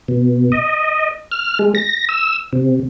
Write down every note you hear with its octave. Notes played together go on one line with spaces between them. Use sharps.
B2
D#5
F6
G#3
A#6
E6
C3